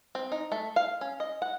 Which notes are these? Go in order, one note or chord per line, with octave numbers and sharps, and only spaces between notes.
C4
D#4
A3
F5
C#4
D#5
F#5